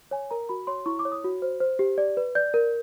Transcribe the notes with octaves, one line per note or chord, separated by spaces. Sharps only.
C#5 G#5
A#4 A#5
F#4 B5
C#5 C6
E4 C#6
D6
C#5
D#6
F#4
C5
C5
G4
D5
B4
D5 G6
A#4